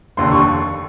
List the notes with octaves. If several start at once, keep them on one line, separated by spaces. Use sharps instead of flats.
F1 D#2 D3 C6
C#6